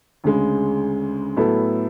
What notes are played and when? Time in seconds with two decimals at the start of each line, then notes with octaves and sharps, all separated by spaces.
0.24 D2 C#3 G#3
1.37 A2 F#3 B3 E4 A4